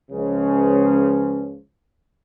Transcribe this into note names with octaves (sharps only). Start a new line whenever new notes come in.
C#2 C#3 F3